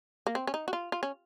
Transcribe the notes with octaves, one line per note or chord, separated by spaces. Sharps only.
A#3
C4
C#4
D#4
F#4
F4
F4
C#4